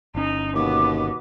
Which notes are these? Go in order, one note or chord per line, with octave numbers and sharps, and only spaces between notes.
G1 C#4 D#4
D#2 B2 B3 D6